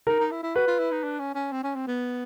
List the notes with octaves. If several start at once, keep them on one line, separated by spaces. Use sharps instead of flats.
D#4 A#4
D#4
E4
E4
F#4 B4
F4
E4
D#4
D4
C#4
C#4
C4
C#4
C4
B3